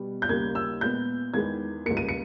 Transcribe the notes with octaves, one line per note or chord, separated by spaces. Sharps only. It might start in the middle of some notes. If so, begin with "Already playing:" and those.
Already playing: B2 G3 B3
G6
D#2 C#3 G3 A#3 G#6
E6
A#2 G#3 B3 G6
E2 D#3 G#3 B3 G#6
C#2 C#3 G3 A#3 C#7
D#7
C#7